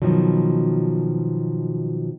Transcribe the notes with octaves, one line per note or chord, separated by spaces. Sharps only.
B2 D#3 F3 F#3